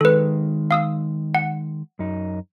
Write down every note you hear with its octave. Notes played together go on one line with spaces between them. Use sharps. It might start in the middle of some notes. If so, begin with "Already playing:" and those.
D#3 G#3 A4 B4
F5 D#6 E6
F#5
F#2 D#4